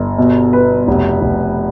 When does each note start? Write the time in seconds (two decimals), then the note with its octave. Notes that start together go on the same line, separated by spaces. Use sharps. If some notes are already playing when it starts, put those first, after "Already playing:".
Already playing: G1
0.18 B2
0.53 B4
0.88 F1
1.21 F1